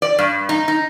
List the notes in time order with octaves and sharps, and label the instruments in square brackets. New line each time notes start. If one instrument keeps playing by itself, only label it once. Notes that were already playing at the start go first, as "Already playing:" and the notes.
[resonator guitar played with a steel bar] D5
G2
D#4
D#4